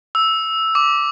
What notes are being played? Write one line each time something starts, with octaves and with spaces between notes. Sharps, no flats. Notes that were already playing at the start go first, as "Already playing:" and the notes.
E6
D6